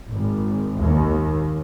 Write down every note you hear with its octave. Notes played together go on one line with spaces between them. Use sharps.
G#1
D#2